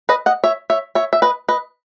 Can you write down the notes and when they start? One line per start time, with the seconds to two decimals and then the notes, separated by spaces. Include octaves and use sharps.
0.09 B4 D#5
0.26 D#5 F#5
0.44 C#5 E5
0.70 C#5 E5
0.95 C#5 E5
1.13 E5
1.22 B4 D#5
1.48 B4 D#5